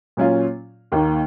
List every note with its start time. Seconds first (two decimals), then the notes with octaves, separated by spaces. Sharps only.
0.17 A#2 F#3 C#4 F4
0.92 D#2 D#3 A#3